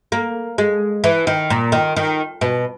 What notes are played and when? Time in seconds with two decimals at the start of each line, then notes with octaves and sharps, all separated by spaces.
0.12 A#3
0.58 G#3
1.04 E3
1.27 D#3
1.50 A#2
1.72 D#3
1.96 D#3
2.41 B2